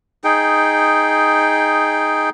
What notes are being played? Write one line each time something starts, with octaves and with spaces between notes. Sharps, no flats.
D#4 G#4 G5